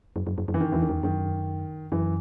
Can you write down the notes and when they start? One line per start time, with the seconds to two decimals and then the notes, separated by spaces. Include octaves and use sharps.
0.16 F#2
0.27 F#2
0.38 F#2
0.48 F#2
0.54 E3
0.60 D#3
0.72 E2 E3
0.82 D#3
0.89 E2
1.03 F#2 D#3
1.92 F#2 E3